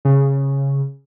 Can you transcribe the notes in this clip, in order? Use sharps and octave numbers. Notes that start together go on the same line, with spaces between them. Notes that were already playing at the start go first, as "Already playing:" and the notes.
C#3